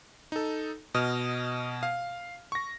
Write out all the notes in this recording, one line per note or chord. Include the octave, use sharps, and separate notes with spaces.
D#4 A4
B2 D#5 D#6 F6
F5
C#6 A#6